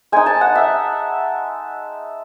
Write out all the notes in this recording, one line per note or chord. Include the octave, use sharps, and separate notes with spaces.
G#3 D#4 G#5
A5
F#5
E5